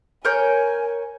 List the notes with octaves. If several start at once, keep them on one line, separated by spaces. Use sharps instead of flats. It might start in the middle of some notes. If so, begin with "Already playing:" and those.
A#4 C#5 G#5 G6